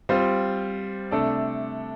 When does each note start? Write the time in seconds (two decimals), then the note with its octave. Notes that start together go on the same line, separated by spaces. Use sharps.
0.09 G3 C4 F4 C5
1.11 C3 A3 D4 A4 D5